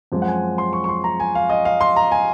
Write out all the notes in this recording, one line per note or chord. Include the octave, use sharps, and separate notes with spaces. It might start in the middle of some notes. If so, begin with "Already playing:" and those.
F#2 F3 G#3 C4
F#5
G#5
C6
C#6
C#6
C6
A#5
G#5
F5
D#5
F5
C6
A#5
G#5